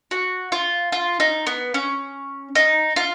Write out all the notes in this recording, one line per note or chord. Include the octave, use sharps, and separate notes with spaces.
F#4
F4
F4
D#4
B3
C#4
D#4
F4